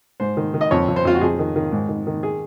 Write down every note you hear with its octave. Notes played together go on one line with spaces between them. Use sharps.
G#2 C5
D#3
D#3
D#5
F2 C#5
F2
C5
F2 F4
F#4
F2 G#4
D#3
D#3
G#2
D#3
D#3
G#4